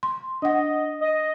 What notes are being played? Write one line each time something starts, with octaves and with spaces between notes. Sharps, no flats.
C6
D4 D#5 F#5
D#5